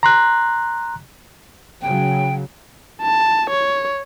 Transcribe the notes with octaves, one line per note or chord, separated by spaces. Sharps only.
A#5 C6 F#6
C#3 F#3 G5
A5
C#5